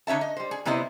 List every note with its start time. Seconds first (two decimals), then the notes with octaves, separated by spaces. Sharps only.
0.07 D3 D#4 C#5 E5 A5
0.21 D#5
0.37 G3 C5
0.51 G#4
0.65 C3 G3 B3 E4 C5 D#5